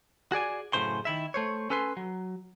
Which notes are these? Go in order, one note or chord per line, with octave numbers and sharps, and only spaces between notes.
F#4 G#4 D5 G#5
F#2 A2 C#3 C5 C6
D#3 E4 E5
A3 C5 C#5
C#4 A4 B4 G#5 C6
F#3